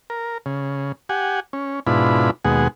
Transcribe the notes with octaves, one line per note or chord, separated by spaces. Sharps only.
A#4
C#3
G4 F#5 G#5
C#4
G#2 B2 D4 E4 F4 B5
D#2 B2 G#3 G#4 F#5